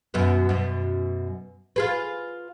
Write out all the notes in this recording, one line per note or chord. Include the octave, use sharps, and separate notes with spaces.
F#2 B2 B3
F#2 B2
F4 G#4 B4